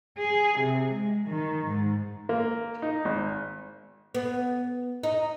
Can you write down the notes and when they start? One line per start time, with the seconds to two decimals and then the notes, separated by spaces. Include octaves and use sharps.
0.18 G#4
0.59 C3
0.92 G#3
1.27 D#3
1.68 G#2
2.29 A#3
2.82 D#4
3.05 G#1
4.15 B3
5.03 D#4